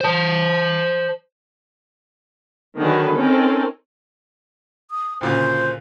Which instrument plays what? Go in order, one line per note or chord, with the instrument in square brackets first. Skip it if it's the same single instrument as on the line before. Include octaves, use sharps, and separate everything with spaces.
[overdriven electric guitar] C5 A5
[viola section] D3 D#3 F#3 G#4 B4
C4 C#4 D#4 A4 A#4
[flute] D#6
[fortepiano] D2 A#2 C#3 [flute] C5